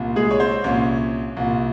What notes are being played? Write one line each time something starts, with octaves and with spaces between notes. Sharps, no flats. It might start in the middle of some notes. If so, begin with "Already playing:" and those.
Already playing: C2 A#2
G#3 G#4
C#5
C4 C5
C2 A#2 C#4 C#5
C2 A#2